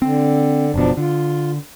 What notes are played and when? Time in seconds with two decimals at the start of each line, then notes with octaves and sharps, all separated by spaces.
0.02 D3 C4
0.74 F#1 B2 F3 D4
0.97 D3 F4